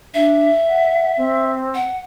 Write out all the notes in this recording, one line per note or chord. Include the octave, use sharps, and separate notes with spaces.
D4 E5
F#5
C4
F#5